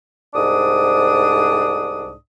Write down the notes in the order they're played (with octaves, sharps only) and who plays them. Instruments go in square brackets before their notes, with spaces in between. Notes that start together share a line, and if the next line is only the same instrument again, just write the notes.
[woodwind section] C2 G#2 D4 D#6